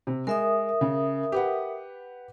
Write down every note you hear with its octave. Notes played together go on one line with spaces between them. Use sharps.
C3
G#3 A#4 E5 D#6
C#3
G4 B4 F#5